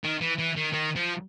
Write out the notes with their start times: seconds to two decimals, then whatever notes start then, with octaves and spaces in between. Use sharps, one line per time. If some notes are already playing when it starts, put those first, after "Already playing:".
0.04 D#3
0.21 E3
0.38 E3
0.56 D#3
0.72 D#3
0.96 F3